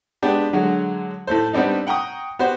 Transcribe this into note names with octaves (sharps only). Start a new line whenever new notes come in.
G#3 B3 D4 G4
D3 F#3 G#3 F#4
A2 A3 A4 C5
G3 B3 C4 D4 D#4
F#5 G5 A#5 C#6 D#6
B3 F#4 G4 C5